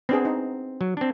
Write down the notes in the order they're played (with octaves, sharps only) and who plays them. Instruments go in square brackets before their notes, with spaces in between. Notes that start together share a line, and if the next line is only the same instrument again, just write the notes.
[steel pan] B3 D4 G#4 [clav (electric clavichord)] C4
[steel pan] D#4
[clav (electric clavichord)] F#3
C4 D4